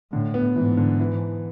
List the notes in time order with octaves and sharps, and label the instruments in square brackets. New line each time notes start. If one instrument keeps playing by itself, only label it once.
[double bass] A2 [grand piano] D3
[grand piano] B3
[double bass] G#2 [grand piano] E3
[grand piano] D3
E3